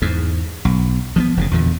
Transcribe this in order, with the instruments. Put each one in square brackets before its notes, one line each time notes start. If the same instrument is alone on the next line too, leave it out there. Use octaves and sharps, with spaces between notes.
[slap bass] E2 G#2
B1
F3 A#3 B3
F1 A#2 C#3
E2 A#2 D3